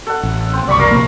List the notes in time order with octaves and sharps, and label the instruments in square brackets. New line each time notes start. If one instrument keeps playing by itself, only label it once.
[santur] A4 F#5
[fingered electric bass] A1
[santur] C4
[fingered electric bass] F#1 C2 [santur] D5 B5 C#6
[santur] A#4 F5 A#5
[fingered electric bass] A#1 C3 A#3 [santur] B5